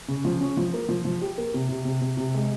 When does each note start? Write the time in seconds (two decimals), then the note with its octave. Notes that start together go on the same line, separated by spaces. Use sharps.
0.08 C#3
0.25 F3
0.41 C#4
0.57 F3
0.74 A#3
0.89 F3
1.05 F3
1.21 G4
1.38 A#3
1.54 C3
1.69 C3
1.85 C3
2.01 C3
2.17 C3
2.34 G#3